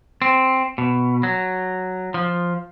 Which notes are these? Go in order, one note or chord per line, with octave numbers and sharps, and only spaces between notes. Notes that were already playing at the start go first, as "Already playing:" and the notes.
C4
B2
F#3
F3